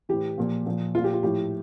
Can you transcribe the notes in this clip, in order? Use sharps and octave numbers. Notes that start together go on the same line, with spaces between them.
A2 E3 G4
A#2 F3
A#2 F3
A#2 F3 F4
G4
F4
A2 F3 G4